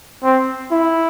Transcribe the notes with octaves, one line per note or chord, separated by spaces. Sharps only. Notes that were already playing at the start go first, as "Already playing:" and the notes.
C4
E4